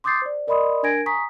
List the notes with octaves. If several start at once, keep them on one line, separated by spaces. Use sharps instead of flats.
C6 D6 D#6 G6 A6 C7
C5 D5
A#4 D5 D#5 B5 C6 D#6
D4 A#4 G#5 G#6 A#6 D7
G#5 A#5 C#6 D#6 B6